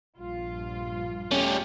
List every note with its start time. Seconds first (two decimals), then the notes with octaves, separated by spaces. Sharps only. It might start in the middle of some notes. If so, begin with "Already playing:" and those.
0.17 A#1 G2 F4
1.31 G3 A3 C#4